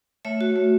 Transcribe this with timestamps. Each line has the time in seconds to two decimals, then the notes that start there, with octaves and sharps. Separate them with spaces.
0.25 A3 C#5 E5
0.41 F#4
0.56 A3